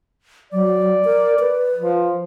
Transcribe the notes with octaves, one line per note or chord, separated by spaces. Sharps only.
F#3 D5
A#4
B4
F3